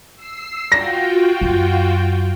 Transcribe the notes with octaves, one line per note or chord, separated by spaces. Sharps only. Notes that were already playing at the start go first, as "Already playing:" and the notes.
E6 C7
F4 F#4 G5 A#6
F#2